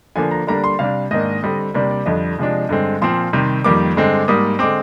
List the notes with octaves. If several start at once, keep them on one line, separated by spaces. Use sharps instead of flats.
D3 F3 A#3 D4 G#5
A#5
D3 G3 A#3 D4 A#5
C6
C3 G3 D4 F5
G#2 D#3 A#3 D4 D#5
D3 G3 C4
C3 G3 A#3 D4 D5
D5
F2 D3 G3 D4 D#5
C3 F3 G#3 D4
G2 D3 G#3 C4
A#2 F3 C4 C6
C3 D#3 G3
F2 D#3 G3 A#3 D6
G2 D3 G#3 C4
G#2 G3 A#3 D#6
D3 G#3 C4 D6